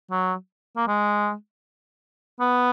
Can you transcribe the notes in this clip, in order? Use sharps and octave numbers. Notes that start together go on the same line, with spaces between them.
F#3
A#3
G#3
B3